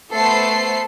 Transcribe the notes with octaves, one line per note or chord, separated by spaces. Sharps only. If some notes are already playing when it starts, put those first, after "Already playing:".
A3 B3 A4 C5 C7